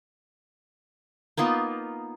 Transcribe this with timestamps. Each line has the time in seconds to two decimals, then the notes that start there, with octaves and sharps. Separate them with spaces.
1.37 A#3 B3 D#4 F4